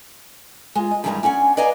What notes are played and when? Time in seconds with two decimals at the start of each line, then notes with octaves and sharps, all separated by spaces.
0.75 G#3 F4
0.91 D#5
1.04 G2 D#3 E3 G3 G#3 A#5
1.23 C#4 D4 F#5 G#5
1.57 B4 D5 D#5 F5 G#5 A#5